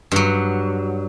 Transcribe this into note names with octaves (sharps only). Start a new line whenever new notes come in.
G2 F#3